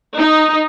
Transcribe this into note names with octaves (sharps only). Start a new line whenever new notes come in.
D#4